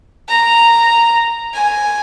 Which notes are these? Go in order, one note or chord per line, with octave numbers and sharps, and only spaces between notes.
A#5
G#5